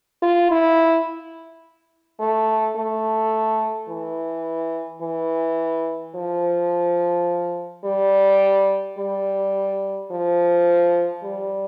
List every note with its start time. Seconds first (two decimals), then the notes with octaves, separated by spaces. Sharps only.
0.23 F4
0.51 E4
2.20 A3
2.76 A3
3.89 E3
5.02 E3
6.15 F3
7.85 G3
8.98 G3
10.12 F3
11.24 G3